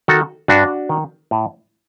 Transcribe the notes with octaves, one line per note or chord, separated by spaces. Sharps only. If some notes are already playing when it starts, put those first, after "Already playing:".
D#3 F#4 A4
G2 D4 F#4
D#3
A2